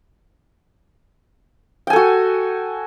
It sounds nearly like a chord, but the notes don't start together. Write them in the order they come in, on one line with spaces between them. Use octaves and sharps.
G5 G#5 A4 F#4